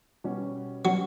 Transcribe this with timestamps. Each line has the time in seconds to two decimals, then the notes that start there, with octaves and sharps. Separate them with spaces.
0.24 B2 G3 C#4
0.85 B2 F#3 G3 C#4